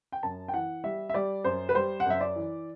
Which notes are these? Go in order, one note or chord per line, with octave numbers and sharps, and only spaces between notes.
G5
F#2 A5
G5
E3 F#5
G3 E5
E5
G3 D5
F#2 C5
B4
G3 C5
F#5
F#2 E5
D5
E3